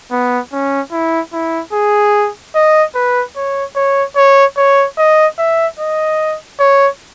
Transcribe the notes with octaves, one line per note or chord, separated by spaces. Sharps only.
B3
C#4
E4
E4
G#4
D#5
B4
C#5
C#5
C#5
C#5
D#5
E5
D#5
C#5